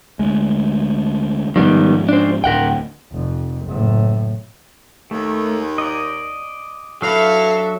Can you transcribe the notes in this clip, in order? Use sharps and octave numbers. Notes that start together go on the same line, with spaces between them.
D2 G#3
G#2 D#3 F3 G3 B3
D4 C5
D1 D2 A#4 F#5 G5
F1 F2
F#1 A2
D#2 A3
D5 D#5
F#3 D4 E4 F#4 A4 B4 E5 F5